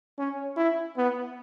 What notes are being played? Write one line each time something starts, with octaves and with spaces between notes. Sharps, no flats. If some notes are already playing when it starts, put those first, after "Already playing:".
C#4
E4
B3